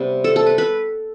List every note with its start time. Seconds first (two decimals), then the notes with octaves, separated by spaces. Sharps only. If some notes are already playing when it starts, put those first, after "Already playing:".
Already playing: C3 G3 B3
0.24 A4
0.36 A4
0.46 B4
0.58 B4